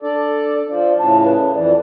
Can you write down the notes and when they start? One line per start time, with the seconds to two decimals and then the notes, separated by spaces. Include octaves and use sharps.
0.02 D4 A4 D5
0.68 F3 D5
0.99 A2 C#3 A5
1.25 B4
1.55 F2 E3 D5